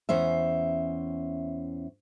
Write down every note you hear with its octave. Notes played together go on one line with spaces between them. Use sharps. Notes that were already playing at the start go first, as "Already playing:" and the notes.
E2 C#4 C5 E5